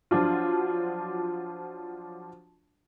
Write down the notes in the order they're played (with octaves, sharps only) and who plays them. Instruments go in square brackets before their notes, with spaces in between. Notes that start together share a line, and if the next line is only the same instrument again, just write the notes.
[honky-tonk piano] F3 F#3 D4 F4